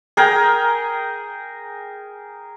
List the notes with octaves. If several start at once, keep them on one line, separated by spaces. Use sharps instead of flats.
G#4 A#4 G5